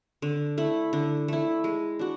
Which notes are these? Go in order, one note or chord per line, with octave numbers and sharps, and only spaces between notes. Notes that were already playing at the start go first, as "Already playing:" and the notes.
D3
A3 E4
D3
A3 E4
G#3
D4 F#4